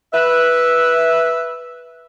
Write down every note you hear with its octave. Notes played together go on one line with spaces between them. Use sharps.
B4 E5